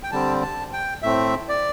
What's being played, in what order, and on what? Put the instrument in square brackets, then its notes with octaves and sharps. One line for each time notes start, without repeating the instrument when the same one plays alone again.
[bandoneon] G5
D3 G3 C4 A5
A5
G5
A2 A3 C4 E5
D5